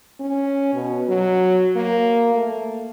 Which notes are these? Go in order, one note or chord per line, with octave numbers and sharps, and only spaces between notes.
C#4
B2
F#3
A#3
A3